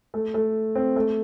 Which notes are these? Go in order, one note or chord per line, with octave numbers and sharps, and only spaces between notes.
A3
A3
C4
A3